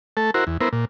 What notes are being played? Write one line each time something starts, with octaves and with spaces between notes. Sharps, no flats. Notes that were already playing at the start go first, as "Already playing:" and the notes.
A3 A4
E4 F#4 A#4 C5
E2
B3 E4 A#4 C5
A#2